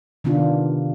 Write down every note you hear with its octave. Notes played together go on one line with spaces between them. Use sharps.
C3 D#3 B3 D4 F4